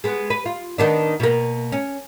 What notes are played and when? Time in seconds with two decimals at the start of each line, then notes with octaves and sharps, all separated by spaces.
0.04 G#3 B3
0.30 B4
0.46 F4
0.78 D#3 B3 D4
1.20 B2 A#3
1.72 C#4